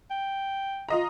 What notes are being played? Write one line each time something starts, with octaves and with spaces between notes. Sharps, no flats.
G5
F4 D#5 A#5